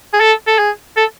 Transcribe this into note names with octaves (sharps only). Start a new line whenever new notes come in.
G#4
A4
A4
G#4
A4